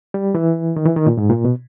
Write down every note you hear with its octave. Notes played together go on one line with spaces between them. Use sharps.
G3
E3
D#3
E3
D#3
A#2
G#2
A#2
B2